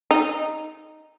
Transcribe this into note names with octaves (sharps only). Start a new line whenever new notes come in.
D#4